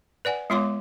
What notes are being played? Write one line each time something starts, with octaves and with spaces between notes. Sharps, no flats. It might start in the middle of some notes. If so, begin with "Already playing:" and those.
B4 D5 F#5 G#5
G#3 B3 F4 C#5 C6 D6